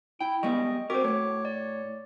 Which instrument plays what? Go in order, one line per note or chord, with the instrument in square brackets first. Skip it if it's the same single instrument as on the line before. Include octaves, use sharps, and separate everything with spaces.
[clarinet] E4 [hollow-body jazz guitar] G5
[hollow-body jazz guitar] G3 G#3 B3 [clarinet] D#5 [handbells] G5 C#6
[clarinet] C4 [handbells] F#4 D6 [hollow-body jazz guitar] A#4 C5
[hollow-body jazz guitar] A2 A3 [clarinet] C#5
[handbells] D5